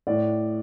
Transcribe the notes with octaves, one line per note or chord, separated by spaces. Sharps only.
A2 D5